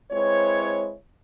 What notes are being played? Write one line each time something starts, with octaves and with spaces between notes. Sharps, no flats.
G#3 C4 E4 B4 C#5